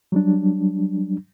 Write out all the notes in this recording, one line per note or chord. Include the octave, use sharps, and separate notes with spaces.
F#3 G3 D4